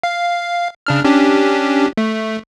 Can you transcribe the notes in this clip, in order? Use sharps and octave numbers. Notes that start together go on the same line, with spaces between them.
F5
C#3 D4 F6
C#4 D4 G4
A3